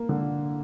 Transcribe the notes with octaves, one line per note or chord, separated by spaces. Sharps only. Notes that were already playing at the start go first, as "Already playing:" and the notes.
Already playing: A#3
D3